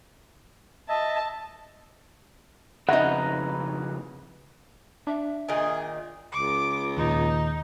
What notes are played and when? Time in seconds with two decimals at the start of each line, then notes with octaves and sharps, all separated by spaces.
0.89 D#5 E5 A5
2.89 F2 C#3 D#4 B4 E5 F#5 A#5
5.07 D4 E5
5.49 A#2 D#3 G#4
6.32 C#2 D6
6.97 D#2 A#2 D#4